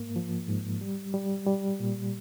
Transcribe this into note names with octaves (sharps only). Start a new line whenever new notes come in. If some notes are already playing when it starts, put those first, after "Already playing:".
Already playing: G#2 A#3
F3
G#2
G3
G3
G3
A#2